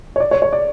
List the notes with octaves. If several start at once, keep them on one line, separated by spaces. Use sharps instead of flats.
C#5
D5
C#5
C#5
D5